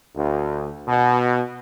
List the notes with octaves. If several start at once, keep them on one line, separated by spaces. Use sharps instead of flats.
D2
B2